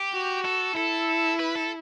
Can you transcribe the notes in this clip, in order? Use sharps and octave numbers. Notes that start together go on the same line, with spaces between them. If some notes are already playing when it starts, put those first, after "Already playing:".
Already playing: G4
F#4
A4
E4 A4
B4
A4